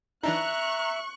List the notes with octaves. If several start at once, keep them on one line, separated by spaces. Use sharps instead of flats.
E3 D4 D#4 E5 A#5 C#6 F#6